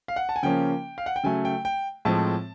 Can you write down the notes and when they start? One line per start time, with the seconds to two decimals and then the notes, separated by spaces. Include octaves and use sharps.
0.08 F5
0.16 F#5
0.29 A5
0.36 G#5
0.43 C#3 F3 A#3 C#4 G5
0.98 F5
1.06 F#5
1.16 G5
1.24 C#3 F#3 A3 G#5
1.45 G5
1.65 G5
2.05 A2 F3 G#3 C4 A5